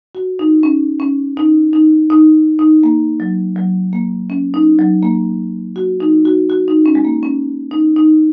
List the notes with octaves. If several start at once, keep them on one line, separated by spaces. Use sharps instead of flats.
F#4
D#4
C#4
C#4
D#4
D#4
D#4
D#4
A#3
F#3
F#3
A#3
C#4
D#4
F#3
A#3
F#4
D#4
F#4
F#4
D#4
C#4
G#3
A#3
C#4
D#4
D#4